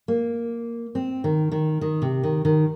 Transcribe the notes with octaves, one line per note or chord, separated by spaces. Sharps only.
A#3
C4
D#3
D#3
D#3
C3
D#3
D#3